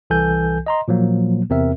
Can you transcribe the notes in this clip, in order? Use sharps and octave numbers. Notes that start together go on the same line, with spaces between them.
C2 E3 A4 G#5 G6
D#5 A#5 C6
A#2 F3 F#3 A#3
E2 C3 C4 A#4 E5